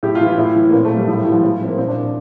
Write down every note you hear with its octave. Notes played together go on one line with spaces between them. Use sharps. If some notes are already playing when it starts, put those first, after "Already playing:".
A2 G4
F4
E3
E4
A2
E3
A#3
A#2 C4
A3
G3
A2 F3
G3
E3
F3
A2 G3
E3 C4
A#3
A#2 C4
D4